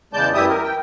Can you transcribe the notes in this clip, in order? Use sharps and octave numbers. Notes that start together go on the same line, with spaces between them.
E2 C#3 G#3 D5 A5 G6
F#2 E3 E4 G4 E5 D#6
A#4
G5